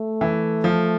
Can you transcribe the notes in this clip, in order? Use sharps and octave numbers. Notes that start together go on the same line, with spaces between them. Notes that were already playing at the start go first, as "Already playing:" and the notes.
Already playing: A3
E3
F3